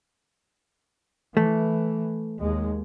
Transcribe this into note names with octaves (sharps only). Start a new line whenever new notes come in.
E3 A3
D#2 G#3